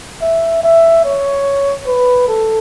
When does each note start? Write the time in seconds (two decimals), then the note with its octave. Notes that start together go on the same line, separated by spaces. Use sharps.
0.22 E5
0.63 E5
1.04 C#5
1.87 B4
2.28 A4